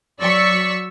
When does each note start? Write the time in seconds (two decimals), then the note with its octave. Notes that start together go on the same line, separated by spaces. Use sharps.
0.21 F#3 D5 C#6 E6 B6